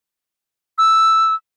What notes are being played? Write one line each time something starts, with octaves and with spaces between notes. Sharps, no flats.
E6